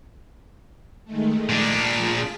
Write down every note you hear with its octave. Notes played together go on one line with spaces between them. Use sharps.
D#3 G#3 A3
A#2 D4 A5 F6 B6
F4 G#4